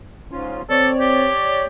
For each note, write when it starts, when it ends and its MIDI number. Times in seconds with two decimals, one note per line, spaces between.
0.32 0.62 44
0.32 0.62 61
0.32 0.62 65
0.70 1.30 60
0.70 0.89 69
0.70 1.66 73
0.70 1.66 74
1.01 1.66 67